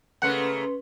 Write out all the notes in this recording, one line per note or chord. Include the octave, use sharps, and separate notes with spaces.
C#3 A3 A#3 C#4 B4 F#5 C6